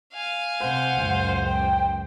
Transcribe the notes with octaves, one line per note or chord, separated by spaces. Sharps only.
F5 G#5
C3 C5 F#5
C#2 F#2 A#2
G5